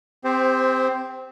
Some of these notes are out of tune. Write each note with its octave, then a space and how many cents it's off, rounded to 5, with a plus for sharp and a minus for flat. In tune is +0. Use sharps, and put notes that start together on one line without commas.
C4 -15 G4 +30 C5 +0